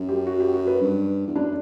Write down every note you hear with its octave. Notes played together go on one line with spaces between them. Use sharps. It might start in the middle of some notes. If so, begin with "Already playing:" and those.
Already playing: F#2
G4
F#4
G4
F#4
B4
G2
E2
F#2 D4